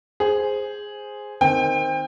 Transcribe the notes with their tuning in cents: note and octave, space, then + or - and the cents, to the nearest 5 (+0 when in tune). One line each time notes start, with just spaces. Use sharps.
G#4 +0 C5 +0
D#3 +0 C4 -5 G5 +30